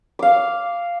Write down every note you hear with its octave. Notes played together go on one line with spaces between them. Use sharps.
F5 D6